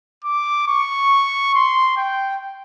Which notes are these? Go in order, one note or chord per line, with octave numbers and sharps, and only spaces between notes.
D6
C#6
C6
G5